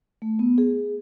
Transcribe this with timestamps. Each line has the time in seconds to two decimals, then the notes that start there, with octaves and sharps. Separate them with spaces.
0.22 A3
0.39 B3
0.58 G#4